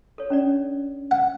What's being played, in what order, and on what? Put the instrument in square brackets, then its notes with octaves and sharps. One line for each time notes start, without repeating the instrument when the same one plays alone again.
[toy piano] A4 C#5
C#4 D4 D5
[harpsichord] F#5